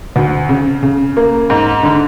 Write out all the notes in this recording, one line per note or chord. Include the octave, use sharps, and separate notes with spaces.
D2
C#3
C#3
A#3
G#2
D3